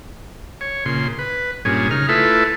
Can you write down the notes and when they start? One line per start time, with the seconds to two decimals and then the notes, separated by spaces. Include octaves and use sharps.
0.61 C#5
0.85 A#2 C#3 C6
1.19 B4
1.65 G2 A#2 C#4 G#4
1.91 C#3 D#4 F6
2.09 A3 E4 F4 A4 B4 E5